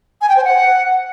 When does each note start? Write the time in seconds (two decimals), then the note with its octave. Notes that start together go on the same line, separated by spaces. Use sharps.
0.21 G#5
0.29 G5
0.37 C5
0.44 F#5